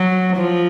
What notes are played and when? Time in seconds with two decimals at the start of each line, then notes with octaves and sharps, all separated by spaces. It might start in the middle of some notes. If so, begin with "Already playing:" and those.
Already playing: F#3
0.36 F3